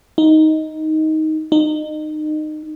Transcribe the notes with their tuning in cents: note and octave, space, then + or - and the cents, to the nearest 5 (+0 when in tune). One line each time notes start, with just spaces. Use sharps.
D#4 +10
D#4 -25